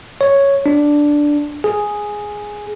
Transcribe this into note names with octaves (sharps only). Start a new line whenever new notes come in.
C#5
D4
G#4